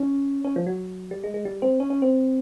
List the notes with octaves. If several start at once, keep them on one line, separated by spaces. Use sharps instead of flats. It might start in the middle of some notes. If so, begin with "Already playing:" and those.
Already playing: C#4
C#4
F3
F#3
G3
G#3
G#3
G3
C4
C#4
C#4
C4